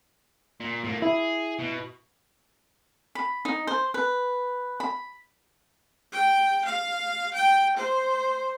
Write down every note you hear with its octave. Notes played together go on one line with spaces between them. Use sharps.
A#2
A2 A#3
E4 G#4
B2
B5
D#4
C5
B4
B5
G5
F5
G5
C5